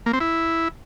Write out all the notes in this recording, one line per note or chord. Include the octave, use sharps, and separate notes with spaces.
A#3
C4
E4